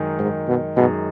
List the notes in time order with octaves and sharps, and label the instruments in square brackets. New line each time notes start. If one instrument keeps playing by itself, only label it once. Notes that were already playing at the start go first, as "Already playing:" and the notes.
Already playing: [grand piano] F#2 D#3 G#3 D#4 G#4
[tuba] G#2
B2
[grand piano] F#2 D#3 G#3 D#4 G#4 [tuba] B2